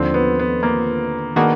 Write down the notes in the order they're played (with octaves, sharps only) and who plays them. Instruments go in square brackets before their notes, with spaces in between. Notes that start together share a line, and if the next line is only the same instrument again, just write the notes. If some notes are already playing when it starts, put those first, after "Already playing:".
Already playing: [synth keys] D#2 D3 F3 [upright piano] C4
[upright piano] B3
B3
A#3
[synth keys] D#3 G#3 B3 D4 F#4 [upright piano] A#3